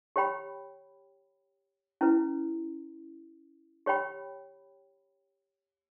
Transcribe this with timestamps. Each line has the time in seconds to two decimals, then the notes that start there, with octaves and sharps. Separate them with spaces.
0.16 G4 C#5 G5 B5
2.01 C#4 E4 B4
3.86 G4 C#5 G5 B5